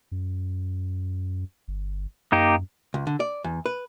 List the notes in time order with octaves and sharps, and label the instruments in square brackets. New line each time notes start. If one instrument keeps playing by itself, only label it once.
[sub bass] F#2
G1
[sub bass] F#2 [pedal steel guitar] A#3 D#4 G4
[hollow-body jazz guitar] C#2
D3
D5
E2
B4